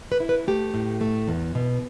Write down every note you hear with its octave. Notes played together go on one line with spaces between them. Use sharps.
B4
E4
B4
A3 G4
A2
A3
E2
B2